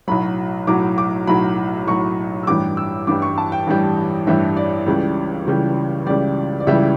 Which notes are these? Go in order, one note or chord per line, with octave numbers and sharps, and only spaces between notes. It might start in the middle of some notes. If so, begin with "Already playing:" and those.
B1 A2 F#3 B5
B1 A2 F#3 D6
D6
B1 A2 F#3 B5
B1 A2 F#3 C#6
E6
A1 G2 E3 G3 D6
E6
A1 G2 E3 G3 D6
C#6
A5
G5
A1 G2 E3 G3
A1 G2 E3 G3 E5
D5
C#2 C#3 E3 G3
C#2 C#3 E3 G3
C#2 C#3 E3 G3 D5
D5
C#2 C#3 E3 G3 E5